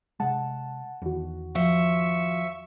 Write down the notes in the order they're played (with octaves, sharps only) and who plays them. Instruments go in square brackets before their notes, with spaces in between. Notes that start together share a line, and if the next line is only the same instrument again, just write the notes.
[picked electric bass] C3 G#3 [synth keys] F#5 A5
[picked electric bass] E2 E3 [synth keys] D#3 F#4
[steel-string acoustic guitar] F3 [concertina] E5 C#6